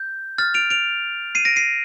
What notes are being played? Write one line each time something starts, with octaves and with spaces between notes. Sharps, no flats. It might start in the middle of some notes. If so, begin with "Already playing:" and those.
Already playing: G6
F6 A6
D7 F7
D7 F7
C7 D#7
A#6 D7
C7 D#7